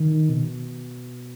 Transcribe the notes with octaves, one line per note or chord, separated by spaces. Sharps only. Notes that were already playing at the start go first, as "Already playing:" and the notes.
Already playing: D#3
B2